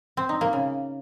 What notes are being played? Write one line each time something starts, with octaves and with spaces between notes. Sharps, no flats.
C4
D#4
A#3
C#3